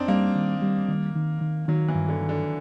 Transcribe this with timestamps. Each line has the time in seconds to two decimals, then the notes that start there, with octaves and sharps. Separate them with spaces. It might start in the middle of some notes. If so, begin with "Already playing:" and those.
Already playing: F2 C4 D4 D#4
0.08 G3 A#3
0.35 D#3
0.62 G3
0.89 D#3
1.16 D#3
1.41 D#3
1.68 D#3 F#3
1.88 E3
1.95 G2
2.09 D3
2.21 D#3
2.29 D3